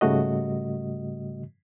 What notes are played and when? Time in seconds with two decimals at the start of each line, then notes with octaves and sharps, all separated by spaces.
0.01 G#2 C#3 G3 A3 F#4 D#5